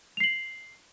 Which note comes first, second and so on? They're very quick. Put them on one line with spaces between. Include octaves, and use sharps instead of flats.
F7 C7 F#7